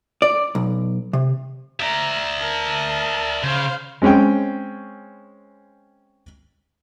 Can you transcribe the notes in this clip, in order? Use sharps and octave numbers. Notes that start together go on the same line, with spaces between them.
D5
B1
C3
D5 E5 A#5
A#4 A5
C#3 C5 F5
G#3 C4 C#4 C#5 G5